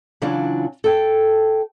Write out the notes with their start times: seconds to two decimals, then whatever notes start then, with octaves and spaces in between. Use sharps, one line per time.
0.22 C#3 E3 F#3 D4 F4 F#4
0.84 A4 G5